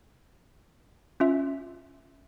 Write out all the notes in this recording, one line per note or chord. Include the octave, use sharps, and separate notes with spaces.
C#4 F4 E5